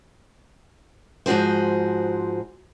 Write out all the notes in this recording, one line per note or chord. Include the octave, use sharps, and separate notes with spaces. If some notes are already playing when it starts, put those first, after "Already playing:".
G#2 F3 F#4 G#4 C5